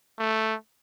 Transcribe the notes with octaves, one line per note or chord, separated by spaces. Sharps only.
A3